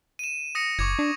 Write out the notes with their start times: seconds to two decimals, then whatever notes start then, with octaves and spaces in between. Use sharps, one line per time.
0.19 D#7 E7
0.55 D#6 A#6 C#7
0.79 F#1 C#6 D6 G#6
0.99 D4